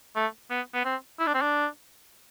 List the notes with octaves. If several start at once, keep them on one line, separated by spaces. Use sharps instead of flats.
A3
B3
B3
C4
E4
D4
C4
D4